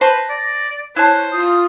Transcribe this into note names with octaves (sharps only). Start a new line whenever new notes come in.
B4 C5 A5 A#6
D5
E4 C5 C#5 A5 F#6
F4 D#6